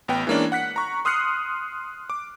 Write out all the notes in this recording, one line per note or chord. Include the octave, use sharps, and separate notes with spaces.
A1 B3 G5
E3 G#3 A#3 C#4 D4
F#5 F#6 B6 C#7
A#5 C#6
C6 D#6 F6 F#6 C7 C#7
D6